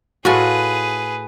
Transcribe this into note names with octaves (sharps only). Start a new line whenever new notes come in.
A2 F4 F#4 G#4 A4 B4 G#5